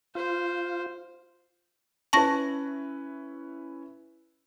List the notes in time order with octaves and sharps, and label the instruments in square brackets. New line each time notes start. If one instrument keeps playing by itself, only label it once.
[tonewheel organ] F4 [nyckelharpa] C5
[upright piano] C#4 E4 B4 [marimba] A5 C#6 A#6